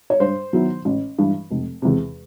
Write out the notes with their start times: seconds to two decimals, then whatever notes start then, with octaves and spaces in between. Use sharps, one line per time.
0.10 C#5
0.20 G2 C5
0.53 D#3 F#3 B3 E4
0.85 A1
1.18 G2 E3
1.50 F1
1.82 E2 C3